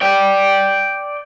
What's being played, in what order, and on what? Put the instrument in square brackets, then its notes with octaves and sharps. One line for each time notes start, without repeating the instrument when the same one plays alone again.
[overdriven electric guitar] D5 G5